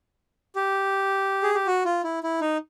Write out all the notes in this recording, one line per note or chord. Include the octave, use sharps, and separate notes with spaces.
G4
G#4
G4
F#4
F4
E4
E4
D#4